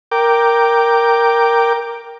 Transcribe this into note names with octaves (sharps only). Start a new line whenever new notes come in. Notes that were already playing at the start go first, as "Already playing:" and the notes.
A#4 G5 D6